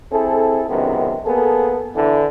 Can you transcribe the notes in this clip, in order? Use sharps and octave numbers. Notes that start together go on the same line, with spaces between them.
C4 E4 G#4 A4
C#2 F#2 C3 D#3 B3
A#3 B3 G#4 A4
D3 E3